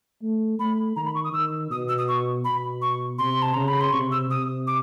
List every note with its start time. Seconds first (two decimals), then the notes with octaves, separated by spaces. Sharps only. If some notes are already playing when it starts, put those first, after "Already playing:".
0.22 A3
0.59 A3 B5
0.96 D#3 A#5
1.05 B5
1.15 C#6
1.24 D#6
1.33 D#3 E6
1.70 B2 D#6
1.89 E6
1.98 D#6
2.08 C#6
2.44 B2 B5
2.82 C#6
3.18 C3 C6
3.42 A5
3.54 C#3 A#5
3.68 B5
3.81 C6
3.93 C3 C#6
4.12 E6
4.30 C3 D#6
4.67 D6